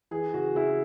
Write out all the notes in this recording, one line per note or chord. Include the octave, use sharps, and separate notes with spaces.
E3 G#4
C#3 F#4
C#3 E4